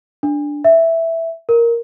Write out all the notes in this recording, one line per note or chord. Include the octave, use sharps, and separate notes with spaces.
D4
E5
A#4